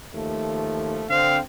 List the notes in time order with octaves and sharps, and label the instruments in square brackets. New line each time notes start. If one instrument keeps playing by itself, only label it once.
[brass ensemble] D#2 F3 A3
[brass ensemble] D3 C4 [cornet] F5